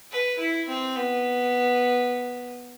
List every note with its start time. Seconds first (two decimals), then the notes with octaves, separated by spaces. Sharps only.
0.11 B4
0.39 E4
0.68 C4
0.96 B3